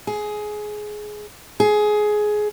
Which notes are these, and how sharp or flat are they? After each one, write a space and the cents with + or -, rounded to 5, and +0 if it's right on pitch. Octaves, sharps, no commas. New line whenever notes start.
G#4 +15
G#4 +15